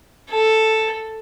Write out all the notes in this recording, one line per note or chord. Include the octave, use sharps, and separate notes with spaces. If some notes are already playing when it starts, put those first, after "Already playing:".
A4